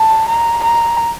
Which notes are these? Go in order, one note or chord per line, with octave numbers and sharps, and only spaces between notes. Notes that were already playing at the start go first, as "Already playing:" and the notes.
Already playing: A5
A#5
A#5